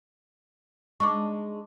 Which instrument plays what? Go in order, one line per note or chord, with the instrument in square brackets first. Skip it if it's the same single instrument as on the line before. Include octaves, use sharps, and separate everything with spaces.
[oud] G#3 D4 D#4 [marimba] C#6 D6